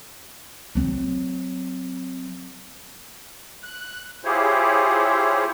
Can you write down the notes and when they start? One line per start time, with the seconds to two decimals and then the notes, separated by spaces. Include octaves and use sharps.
0.75 F#3 C4
3.63 F#6
4.24 E4 F4 G4 G#4 C5 C#5